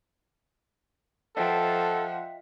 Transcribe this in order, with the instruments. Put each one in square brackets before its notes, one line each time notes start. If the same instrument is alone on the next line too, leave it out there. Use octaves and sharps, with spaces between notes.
[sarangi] F3 [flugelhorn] A4 [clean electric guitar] D#5 E5 G5 [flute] F#5